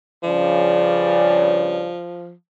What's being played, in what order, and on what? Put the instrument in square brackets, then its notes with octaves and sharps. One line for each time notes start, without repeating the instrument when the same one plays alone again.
[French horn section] G2 C#3 D5 [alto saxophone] F3